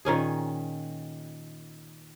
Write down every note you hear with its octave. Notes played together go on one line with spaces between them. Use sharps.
A#2 D#3 C#4 G#4